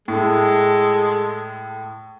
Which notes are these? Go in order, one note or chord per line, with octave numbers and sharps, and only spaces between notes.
A2 G#3 A4